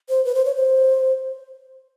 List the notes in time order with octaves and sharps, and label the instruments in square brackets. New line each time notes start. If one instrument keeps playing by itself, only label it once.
[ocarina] C5
B4
C5
C#5
C5